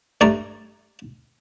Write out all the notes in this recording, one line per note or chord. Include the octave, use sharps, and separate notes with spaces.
G2 A3 D5 A#5